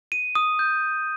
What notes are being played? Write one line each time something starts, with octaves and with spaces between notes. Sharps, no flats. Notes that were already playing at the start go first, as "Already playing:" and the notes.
D#7
D#6
G6